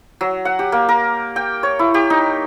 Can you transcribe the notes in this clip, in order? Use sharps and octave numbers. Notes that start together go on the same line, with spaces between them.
F#3
F#5
G4
A#3
A#4
G5
C#5
E4
G4
D#4